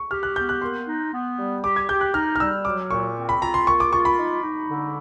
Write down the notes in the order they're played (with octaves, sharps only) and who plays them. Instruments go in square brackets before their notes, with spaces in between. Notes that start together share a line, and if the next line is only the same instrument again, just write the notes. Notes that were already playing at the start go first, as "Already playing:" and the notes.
Already playing: [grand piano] C#6
[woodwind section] G4 [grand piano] F6
[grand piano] F#6
[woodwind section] B3 [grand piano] G6
[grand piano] F#6
[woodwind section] A#3 [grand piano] C6
[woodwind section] D#4
B3
G3
[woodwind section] G4 [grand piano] D6
[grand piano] G#6
[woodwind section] G4 [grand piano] G6
[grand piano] F#6
[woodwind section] D#4 [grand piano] F6
[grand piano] F6
[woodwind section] G3 [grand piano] E6
[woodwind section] F#3 [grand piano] D6
[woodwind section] A#2 [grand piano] C#6
[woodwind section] C4
[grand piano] B5
[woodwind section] F4 [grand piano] A#5
[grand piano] C6
[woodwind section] A#3 [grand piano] C#6
[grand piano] D6
[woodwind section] F4 [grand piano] C#6
[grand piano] B5
[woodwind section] D#4
D#4
D3